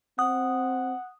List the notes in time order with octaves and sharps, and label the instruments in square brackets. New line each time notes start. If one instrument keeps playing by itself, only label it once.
[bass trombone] C4 [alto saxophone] F#5 [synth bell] D#6